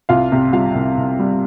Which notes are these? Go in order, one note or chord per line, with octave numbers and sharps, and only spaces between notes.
C2 F4 F5
C3
G3 F4 F5
C2
C2
G3